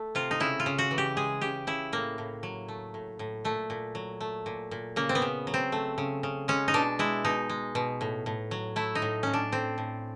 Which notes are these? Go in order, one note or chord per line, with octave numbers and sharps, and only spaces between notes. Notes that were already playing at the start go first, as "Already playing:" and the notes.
Already playing: A3
C3 F4
D#4
C#3 E4
F4
C#3
F#4
E3
G4
G#3 G#4
C#3 G4
C#3 E4
A2 A#3
A2
F#3
A3
A2
A2
A#2 A3
A#2
F#3
A3
A#2
A#2
C#3 A#3
C4
B3
C#3
F#3
C4
A3
C#3
C#3
G#3 C#4
D#4
B2 D4
G#3 E4
B2 D#4
G#3
B2
A2
A2
F#3
A3 E4
D#4
A2
A2 C#4
D4
A2 C4
A2